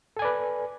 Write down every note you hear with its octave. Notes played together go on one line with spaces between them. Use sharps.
A4 B4 D5 G#5